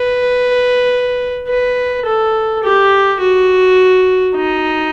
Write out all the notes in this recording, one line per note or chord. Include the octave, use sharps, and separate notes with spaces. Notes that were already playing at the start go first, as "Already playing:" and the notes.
Already playing: B4
B4
A4
G4
F#4
D#4